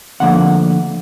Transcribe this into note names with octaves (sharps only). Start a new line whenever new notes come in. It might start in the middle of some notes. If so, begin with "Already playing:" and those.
D2 D3 F3 A#3 F#5